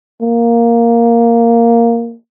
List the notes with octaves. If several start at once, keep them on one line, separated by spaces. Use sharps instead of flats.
A#3